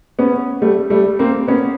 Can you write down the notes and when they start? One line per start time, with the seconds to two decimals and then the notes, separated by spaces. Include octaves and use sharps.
0.19 B3 C#4
0.62 G3 A3
0.90 G3 A3
1.19 A#3 C4
1.48 B3 C#4